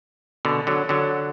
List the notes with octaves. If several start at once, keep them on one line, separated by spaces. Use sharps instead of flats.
B2 D3
D3 F#3
D3 F#3